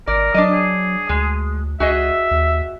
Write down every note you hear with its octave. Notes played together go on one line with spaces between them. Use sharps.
G#1 A#4 D5
F#3 D4 D5 D#5
G#4
D2 G#3
C#2 F#4 G#4 D#5 E5
D#2